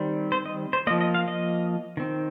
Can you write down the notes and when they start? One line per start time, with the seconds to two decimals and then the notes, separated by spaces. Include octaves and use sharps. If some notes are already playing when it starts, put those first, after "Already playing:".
Already playing: D#3 G3 C4
0.32 C5
0.46 D#5
0.73 C5
0.87 A#3 D#5
0.90 F3
1.01 D#5
1.14 F5
1.28 D#5
1.97 D#3 C4